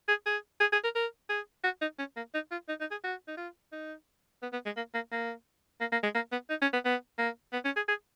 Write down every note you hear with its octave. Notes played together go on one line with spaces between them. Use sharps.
G#4
G#4
G#4
G#4
A#4
A#4
G#4
F#4
D#4
C#4
A#3
D#4
F4
D#4
D#4
G#4
F#4
D#4
F4
D#4
B3
B3
G#3
A#3
A#3
A#3
A#3
A#3
G#3
A#3
B3
D#4
C#4
B3
B3
A#3
B3
C#4
G#4
G#4